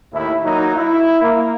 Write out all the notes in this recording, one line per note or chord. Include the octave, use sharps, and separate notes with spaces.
D#2 A2 E4
F#3 A#3 D#4
E4
A#3